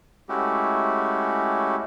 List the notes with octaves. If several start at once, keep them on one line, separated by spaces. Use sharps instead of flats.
G#3 A3 C#4 E4 F#4 G4